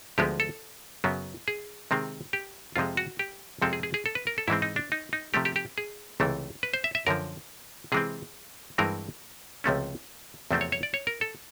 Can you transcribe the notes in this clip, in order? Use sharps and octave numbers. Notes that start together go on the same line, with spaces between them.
D2 D3 F3 G#3 B3 G4
A4
F#2 C#3 F#3 B3
G#4
C3 D#3 G#3 C4
G4
F2 C3 F3 G#3 F4
F#4
G4
F2 C3 F3 G#3 C4 A4
G#4
G#4
G#4
A4
B4
A#4
A4
G#2 E3 G#3 C4 E4
D#4
D4
D#4
D#4
C3 F3 A3 G4
G4
G4
G#4
C#2 C3 E3 A3
B4
C5
E5
E5
F#2 D3 F3 A#4
C3 E3 G#3 C4 G#4
G2 E3 G#3 C4 A#4
C#2 C3 F3 A3 C#4
E2 C3 F3 A3 C4
C#5
C#5
D5
C#5
A#4
A4